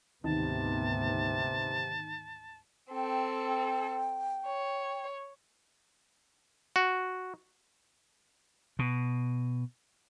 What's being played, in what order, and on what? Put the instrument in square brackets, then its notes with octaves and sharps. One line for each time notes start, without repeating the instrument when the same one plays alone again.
[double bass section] D2 G#2 B3 [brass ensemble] C3 [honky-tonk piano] D#3 [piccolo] A5
[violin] C4 A4 [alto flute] G5
[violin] C#5
[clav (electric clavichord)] F#4
[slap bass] B2